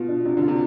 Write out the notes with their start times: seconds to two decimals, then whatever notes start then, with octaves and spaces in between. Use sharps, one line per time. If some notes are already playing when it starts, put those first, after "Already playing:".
Already playing: B2 B3 F4
0.09 D4
0.25 C3 D4
0.37 D3 F4
0.48 C3